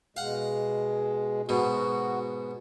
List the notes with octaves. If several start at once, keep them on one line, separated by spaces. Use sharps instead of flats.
B2 G#3 F5 F#5
G#2 B2 F#4